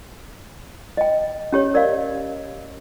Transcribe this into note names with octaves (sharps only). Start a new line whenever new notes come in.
D#5 G5
C#4 G4 C#5
A#4 D5 D#5 F5